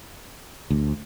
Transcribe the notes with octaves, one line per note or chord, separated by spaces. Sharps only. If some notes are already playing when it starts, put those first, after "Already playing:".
D2